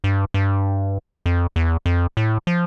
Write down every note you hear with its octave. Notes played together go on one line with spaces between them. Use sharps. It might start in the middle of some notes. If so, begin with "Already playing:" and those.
G2
G2
F2
E2
F2
A2
F3